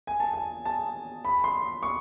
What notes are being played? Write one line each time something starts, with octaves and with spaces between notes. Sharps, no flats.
G#5
A5
G#5
A5
B5
C6
C#6